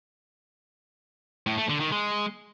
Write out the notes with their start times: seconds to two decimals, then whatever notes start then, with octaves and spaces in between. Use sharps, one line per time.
1.47 A2
1.58 A3
1.69 D3
1.80 D#3
1.92 G#3